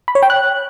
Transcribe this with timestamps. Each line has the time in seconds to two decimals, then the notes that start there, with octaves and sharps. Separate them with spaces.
0.08 B5
0.15 C#5
0.23 G5
0.30 F#6